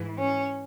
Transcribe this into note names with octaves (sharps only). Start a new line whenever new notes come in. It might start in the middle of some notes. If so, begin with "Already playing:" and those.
Already playing: G#2 E3
C#4